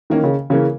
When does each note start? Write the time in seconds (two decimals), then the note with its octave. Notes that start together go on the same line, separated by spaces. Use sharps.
0.10 D#3 E3 A#3 C#4
0.24 C#3
0.50 C#3 E3 A#3 C#4